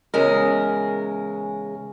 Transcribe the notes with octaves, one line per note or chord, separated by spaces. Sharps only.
E2 C#3 G#3 A#4